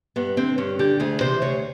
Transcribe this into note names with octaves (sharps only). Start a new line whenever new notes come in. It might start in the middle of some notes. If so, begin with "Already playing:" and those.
G2 B3
D3 C4
G2 C#4
D3 G4
D2 G#4
C3 E3 C5
D2 C#5